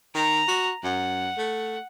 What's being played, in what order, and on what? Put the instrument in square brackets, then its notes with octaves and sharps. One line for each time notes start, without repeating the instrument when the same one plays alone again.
[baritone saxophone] D#3 [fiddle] A#5
[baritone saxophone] F#4
[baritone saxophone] F#2 [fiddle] F#5
[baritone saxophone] A3